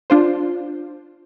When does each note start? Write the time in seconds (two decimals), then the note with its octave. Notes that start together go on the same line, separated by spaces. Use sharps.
0.10 D4 F4 C5